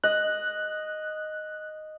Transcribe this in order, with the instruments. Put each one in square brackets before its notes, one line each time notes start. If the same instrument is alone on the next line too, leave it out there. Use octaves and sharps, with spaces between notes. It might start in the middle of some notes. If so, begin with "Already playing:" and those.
[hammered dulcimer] D#5 [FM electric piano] F#6